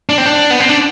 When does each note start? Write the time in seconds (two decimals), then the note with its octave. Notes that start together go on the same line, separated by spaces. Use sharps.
0.09 D4
0.18 C4
0.26 D4
0.51 B3
0.60 C4
0.69 D4